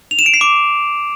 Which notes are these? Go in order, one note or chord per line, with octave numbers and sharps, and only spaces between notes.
F7
E7
D7
C7
D6